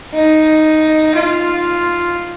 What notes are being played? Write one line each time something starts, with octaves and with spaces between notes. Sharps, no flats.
D#4
F4